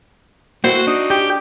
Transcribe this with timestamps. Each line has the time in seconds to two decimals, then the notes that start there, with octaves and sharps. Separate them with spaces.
0.64 A#3 E4 F#4 C5
0.87 D4 D#4
1.10 G4